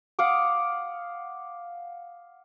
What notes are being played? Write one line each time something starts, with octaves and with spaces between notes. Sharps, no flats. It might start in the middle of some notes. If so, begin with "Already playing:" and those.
F5 F#5 D6 D#6